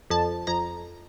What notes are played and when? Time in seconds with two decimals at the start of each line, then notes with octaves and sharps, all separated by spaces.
0.10 F2 A5
0.47 F2 A#5